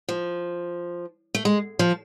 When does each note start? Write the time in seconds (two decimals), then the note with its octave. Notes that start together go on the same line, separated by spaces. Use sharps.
0.09 F3
1.35 A3
1.45 G#3
1.79 F3